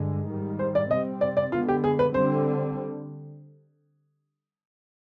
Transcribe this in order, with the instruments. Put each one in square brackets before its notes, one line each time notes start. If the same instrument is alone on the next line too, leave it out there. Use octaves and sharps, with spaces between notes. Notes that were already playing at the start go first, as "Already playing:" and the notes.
Already playing: [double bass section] G2 D3 G#3
G#2 D#3 G3
[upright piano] C5
D5
[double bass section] C3 G3 C4 [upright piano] D#5
[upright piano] D5
D5
[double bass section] D3 G#3 B3 [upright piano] F4
[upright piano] G4
G#4
B4
[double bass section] D3 G3 C4 [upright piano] C5